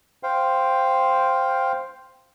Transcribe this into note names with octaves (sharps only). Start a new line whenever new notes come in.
C5 F5 G5